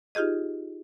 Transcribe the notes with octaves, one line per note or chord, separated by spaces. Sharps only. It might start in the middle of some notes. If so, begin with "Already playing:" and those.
D#4 F4 G4 G#4 D#5